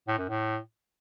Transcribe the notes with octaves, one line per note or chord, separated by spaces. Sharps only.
A2
F#2
A2